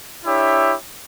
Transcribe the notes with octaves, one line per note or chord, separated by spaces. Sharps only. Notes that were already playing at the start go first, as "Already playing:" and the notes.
D4 E4 G4 C#5 E5